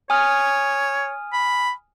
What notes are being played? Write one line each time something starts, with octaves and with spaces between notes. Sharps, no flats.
C#5 G#5 D#6 F6
B5